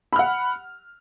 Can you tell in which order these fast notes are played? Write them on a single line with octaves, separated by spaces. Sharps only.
B5 F6 F#5